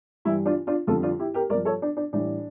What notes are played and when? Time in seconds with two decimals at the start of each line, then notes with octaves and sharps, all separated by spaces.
0.25 G2 E3 G3 E4
0.46 D4 F4
0.67 D4 F4
0.87 F2 D3 G3 F4 A4
1.03 D4 F4
1.19 E4 G4
1.34 G4 A#4
1.50 G2 A#4 D5
1.55 F3
1.65 A4 C#5
1.82 D4
1.97 D4
2.13 A2 E3 G3 D4